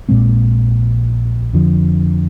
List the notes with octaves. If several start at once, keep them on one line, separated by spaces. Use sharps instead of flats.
A#1 A#2 G#3 C4
F2 D3 F3